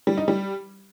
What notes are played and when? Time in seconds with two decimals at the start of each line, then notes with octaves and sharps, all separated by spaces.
0.07 G3
0.17 D#4
0.28 G3